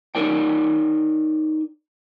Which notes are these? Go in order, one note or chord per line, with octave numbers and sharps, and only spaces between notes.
D#4 A#4 C#5 D5 G5